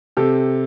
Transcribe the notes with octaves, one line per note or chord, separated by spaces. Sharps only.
C3 G4 A4